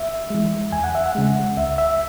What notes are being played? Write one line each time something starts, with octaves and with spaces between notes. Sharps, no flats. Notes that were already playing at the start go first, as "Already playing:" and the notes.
Already playing: E5
E3 G#3
E2 G#5
F#5
E5
F#5
C#3 G#3
C#2 E5
E5